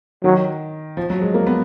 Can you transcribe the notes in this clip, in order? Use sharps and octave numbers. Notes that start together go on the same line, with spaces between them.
D#3 F#3
F3
F#3
G#3
A#3
B3